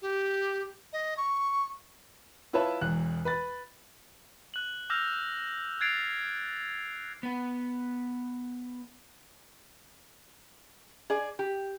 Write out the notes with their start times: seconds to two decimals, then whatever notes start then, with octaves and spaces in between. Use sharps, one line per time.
0.02 G4
0.93 D#5
1.17 C#6
2.53 E4 F4 B4 C#5 E5 A5
2.81 E1 E2 F#6
3.25 B4 B5 A6
4.54 F#6 F#7
4.90 D6 E6 F6 G6 A#6 F7
5.80 F#6 G#6 A6 C7 D7 F7
7.23 B3 B4
11.10 G#4 D5
11.39 G4